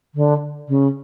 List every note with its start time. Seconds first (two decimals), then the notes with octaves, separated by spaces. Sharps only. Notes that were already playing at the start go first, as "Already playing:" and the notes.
0.15 D3
0.68 C#3